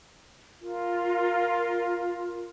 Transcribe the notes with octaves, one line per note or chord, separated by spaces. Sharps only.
F4 A#4